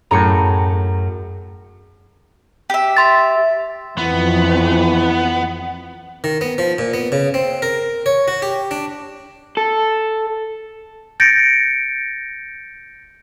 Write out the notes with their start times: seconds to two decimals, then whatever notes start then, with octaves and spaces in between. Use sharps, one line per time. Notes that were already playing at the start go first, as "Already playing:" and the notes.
0.11 F#2 A2 G#4 A#5 C#7
2.70 G4 E5
2.97 C6 A6
3.98 F2 E3 B3
6.24 D#3
6.41 B3
6.58 F3
6.78 A#2
6.94 B3
7.12 C#3
7.34 C4
7.62 A#4
8.06 C#5
8.28 F#4
8.42 G4
8.71 D4
9.57 A4
11.20 G6 A6 A#6 C#7 D7